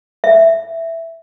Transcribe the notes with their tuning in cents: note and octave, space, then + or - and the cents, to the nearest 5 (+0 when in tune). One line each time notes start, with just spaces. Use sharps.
E5 +0